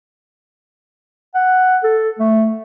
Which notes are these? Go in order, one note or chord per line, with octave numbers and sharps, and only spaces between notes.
F#5
A4
A3